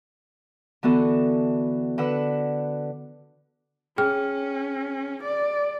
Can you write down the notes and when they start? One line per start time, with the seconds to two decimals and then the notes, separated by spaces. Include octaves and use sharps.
0.83 D3 E3 B3 F#4 A4
1.98 D3 B4 F#5 E6
3.98 C#4 G#4 G5 F6
5.24 D5